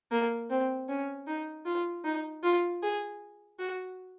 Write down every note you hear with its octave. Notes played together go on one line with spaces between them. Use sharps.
A#3
C4
C#4
D#4
F4
D#4
F4
G#4
F#4